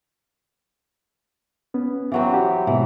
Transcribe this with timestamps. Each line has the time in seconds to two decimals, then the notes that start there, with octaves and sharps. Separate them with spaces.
1.74 B3 C#4
2.12 E3 F#3 C4
2.34 G4
2.67 G#2 B2 E3